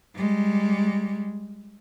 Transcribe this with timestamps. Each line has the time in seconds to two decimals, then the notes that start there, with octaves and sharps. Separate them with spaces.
0.15 G3 G#3